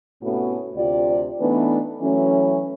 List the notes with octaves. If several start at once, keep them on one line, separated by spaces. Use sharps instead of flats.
A2 C3 A3 B3 C#4 F#4
D2 C3 F4 G4 D5
E3 A3 B3 D4 D#4 B4
E3 F#3 A3 C#4